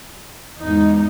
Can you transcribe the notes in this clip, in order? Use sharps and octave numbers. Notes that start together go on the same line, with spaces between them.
E2 G#2 D#4